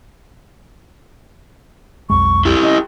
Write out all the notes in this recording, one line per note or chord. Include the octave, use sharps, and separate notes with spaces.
B1 F2 G#3 C#6
E4 G4
C#4 D#5